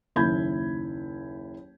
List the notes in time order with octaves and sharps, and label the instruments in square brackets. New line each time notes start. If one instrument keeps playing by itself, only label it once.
[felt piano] F#1 D#2 E4 B5 G6 G#6